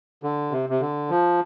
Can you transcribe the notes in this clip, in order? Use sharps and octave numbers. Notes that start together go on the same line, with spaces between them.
D3
C3
C3
D3
F3